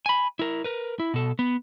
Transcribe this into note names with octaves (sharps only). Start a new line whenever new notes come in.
G#5 B5
E4 A#4
A#4 B4
E4
B2 A4
B3